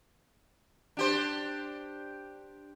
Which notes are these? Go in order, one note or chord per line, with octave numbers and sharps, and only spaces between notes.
D4 G4 C5